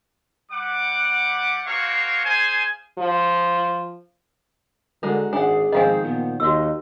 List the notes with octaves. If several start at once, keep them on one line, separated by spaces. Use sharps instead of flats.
G3 F#5 D6
A#3 C4 F#4 A#4 C#5 F5
G#4 C5 F5 G#5
F3
D3 G#3 F#4 A#4
G#1 D4 G#4 F#5 G#5
G#2 D#3 F3 C4 D#5 F5 G#5
A#2 B3
D#2 F#4 D#5 E6